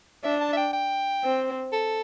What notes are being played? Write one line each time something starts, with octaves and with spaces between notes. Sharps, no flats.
D4 E5
A5
E5
G5
G5
C4
A4